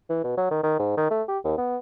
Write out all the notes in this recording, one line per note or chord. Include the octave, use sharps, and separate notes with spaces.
E3
B2
F#3
D#3
D#3
G#2
D#3
A3
G4
D#2
B3